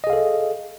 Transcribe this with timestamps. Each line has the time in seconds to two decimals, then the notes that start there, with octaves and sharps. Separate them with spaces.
0.04 D#5
0.07 G#4
0.10 F5
0.13 A4